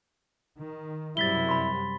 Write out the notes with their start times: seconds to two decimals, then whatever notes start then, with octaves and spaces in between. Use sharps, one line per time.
0.57 D#3
1.17 F#2 C3 G3 E4 A6 B6 G7
1.49 B5 C6